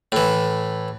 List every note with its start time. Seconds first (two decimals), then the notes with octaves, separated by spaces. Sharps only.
0.12 A2 E3